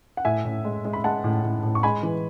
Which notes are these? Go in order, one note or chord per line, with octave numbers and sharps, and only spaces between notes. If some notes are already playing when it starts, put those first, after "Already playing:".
F#5
A2 E5 G#5
A2
G#3
G#3
B5
G#3 F#5 A5
A2
A2
A2
C#6
G#3 G#5 B5
E3